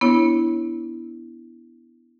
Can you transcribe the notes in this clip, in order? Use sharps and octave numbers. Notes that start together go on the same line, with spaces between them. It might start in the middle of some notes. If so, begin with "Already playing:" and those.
B3 D4 E4 C#5